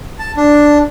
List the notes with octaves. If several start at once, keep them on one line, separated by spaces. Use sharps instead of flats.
A5
D4